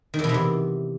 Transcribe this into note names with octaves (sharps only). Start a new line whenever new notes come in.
D#3
E2
B2
C3
E2